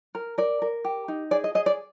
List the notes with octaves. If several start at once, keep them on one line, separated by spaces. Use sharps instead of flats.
A#4
A#4 D5
A#4
G4
D#4
G#4 D5
D#5
G#4 D#5
D5